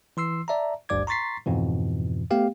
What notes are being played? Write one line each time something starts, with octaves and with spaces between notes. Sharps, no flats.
E3 C6 E6 C7
D5 E5 A5 A#5
G#1 D2 G2 D5 D6 G#6
A#5 C6 C#6 A6 B6 C7
F2 G#2 B2 E3
A3 B3 G4 F5 G5